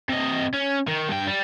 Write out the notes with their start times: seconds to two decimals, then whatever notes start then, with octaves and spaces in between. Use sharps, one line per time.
0.09 C3 D#5
0.53 C#4
0.87 D#3
1.08 G2 G5
1.27 G3